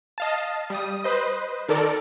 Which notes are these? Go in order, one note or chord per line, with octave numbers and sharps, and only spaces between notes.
D#5 F5 A5
G3 D#6
B4 C5 D#5
D#3 A4 A#4 D5